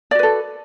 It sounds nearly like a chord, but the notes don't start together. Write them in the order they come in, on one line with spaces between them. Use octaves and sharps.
D5 F#4 B4 A4